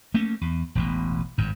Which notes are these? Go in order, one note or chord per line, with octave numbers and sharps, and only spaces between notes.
A3 A#3 C#4
E2
E1 A1 B2
G#1 G2